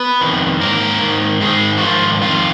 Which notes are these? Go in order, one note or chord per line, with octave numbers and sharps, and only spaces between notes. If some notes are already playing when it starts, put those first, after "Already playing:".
Already playing: B3 B4
F2 D#3
G#2 D#3 A#3 A#4
G#2 D#3
G#2 D#3 G#3 G#4
F#4
G#2 D#3 F3 F4
F2 D#3 F4